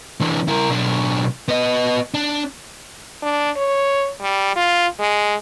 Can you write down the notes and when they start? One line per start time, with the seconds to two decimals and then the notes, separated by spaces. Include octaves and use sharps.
0.20 E3 D4
0.48 E4 A#4
0.69 B1 D4
1.48 B3 D#5
2.14 D4
3.22 D4
3.56 C#5
4.21 G3
4.56 F4
5.00 G#3